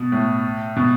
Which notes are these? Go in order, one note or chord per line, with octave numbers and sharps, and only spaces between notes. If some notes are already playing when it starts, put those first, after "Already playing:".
Already playing: B2
A2
B2